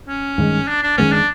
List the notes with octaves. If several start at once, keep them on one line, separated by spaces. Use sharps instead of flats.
C#4
G2 D#3 G#3
D4
D4
F#2 D#3 G#3 B3 C#4
D4